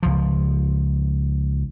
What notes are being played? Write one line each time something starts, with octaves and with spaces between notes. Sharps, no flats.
C#2 F3